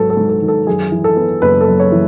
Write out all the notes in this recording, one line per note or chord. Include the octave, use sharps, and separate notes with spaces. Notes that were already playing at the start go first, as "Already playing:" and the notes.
Already playing: G#1 D#3 F#3 A4 B4
A4
G#2
A4
D#3
A4
F#2 G#4
E3
A4
B3
F#1 B4
A4
F#2
C#5
E3